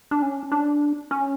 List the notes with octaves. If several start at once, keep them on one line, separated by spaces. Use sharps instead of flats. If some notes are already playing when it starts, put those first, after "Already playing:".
D4
C#4
D4
C#4